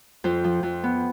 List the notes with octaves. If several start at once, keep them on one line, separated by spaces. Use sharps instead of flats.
F2 C5
F3
F2
B3